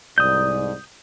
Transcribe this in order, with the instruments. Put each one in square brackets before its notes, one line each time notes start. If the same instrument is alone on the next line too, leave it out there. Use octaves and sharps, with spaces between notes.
[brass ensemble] C2 G#2 D5 [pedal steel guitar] D#6 G6